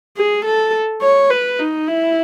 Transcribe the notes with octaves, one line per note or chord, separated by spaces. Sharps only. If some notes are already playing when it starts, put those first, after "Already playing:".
G#4
A4
C#5
B4
D#4
E4